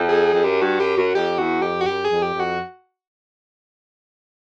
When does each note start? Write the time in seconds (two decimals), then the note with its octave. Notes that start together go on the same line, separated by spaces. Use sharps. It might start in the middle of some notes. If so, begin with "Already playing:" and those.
Already playing: F2
0.09 G#4
0.34 F2
0.44 F#2 G4
0.61 G2 F#4
0.80 F#2 G4
0.97 F#2 F#4
1.15 F2 G4
1.38 E2 F#4
1.62 F2 G4
1.81 F#4
1.86 F#2 G4
2.05 G#4
2.10 F2
2.22 G4
2.33 F2
2.40 F#4